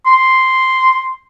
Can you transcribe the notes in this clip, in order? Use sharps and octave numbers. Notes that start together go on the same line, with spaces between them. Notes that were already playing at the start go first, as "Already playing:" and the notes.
C6